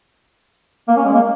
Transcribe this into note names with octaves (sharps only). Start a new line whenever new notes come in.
A#3
C#4
G#3
A#3